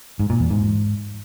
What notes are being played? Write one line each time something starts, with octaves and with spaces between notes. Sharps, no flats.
G#2
A#2
E2
G#2